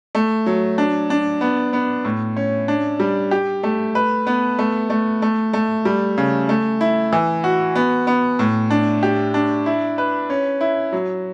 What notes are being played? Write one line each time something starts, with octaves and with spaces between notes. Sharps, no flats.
A3
F#3
D4
D4
B3
B3
A2
C#4
D4
G3
G4
A3
B4
B3
A3
A3
A3
A3
G3
C#3
A3
E4
E3
F#4
B3
B3
A2
D4
G4
D4
E4
B4
C#4
E4
F#3